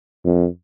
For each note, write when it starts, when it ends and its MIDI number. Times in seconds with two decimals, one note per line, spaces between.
0.25 0.47 41